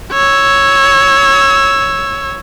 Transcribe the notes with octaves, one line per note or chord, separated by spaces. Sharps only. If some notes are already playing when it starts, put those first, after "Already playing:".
C#5 E6